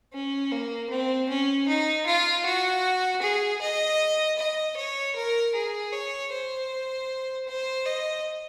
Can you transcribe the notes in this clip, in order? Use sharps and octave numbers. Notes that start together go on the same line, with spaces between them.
C#4
A#3
C4
C#4
D#4
F4
F#4
G#4
D#5
D#5
C#5
A#4
G#4
C#5
C5
C5
D#5